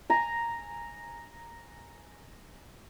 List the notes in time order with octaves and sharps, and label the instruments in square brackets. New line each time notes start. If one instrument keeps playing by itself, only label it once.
[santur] G#5 A#5